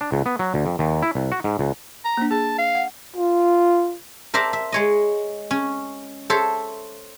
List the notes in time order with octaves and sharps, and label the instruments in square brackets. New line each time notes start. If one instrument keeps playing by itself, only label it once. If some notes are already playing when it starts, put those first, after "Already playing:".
[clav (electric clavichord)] D4
C#2
B3
F#3
D2
F2
D#2
E4
C2
F#4
G#2
C#2
[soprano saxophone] A#5
[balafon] A#3 D4
[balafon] G#4 [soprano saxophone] A5
[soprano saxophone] F5
[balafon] F#5
[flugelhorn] F4
[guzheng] A#4 C5 D5 E5 A5 A#5
E5
G#3 C#5 D#5
C#4
A4 C5 C#5 E5